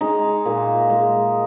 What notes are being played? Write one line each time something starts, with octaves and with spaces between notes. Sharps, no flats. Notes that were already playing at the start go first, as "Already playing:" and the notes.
G#3 D#4
A#2
G#3